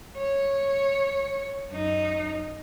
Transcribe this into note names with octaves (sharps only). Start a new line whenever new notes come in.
C#5
F#2 D#4